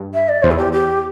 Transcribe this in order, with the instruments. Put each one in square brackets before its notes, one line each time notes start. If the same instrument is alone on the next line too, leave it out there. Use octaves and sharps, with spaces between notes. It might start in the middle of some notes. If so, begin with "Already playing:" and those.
Already playing: [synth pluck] G2
[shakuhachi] E5
D5
[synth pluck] E2 [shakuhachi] C5
[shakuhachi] E4
G4
G4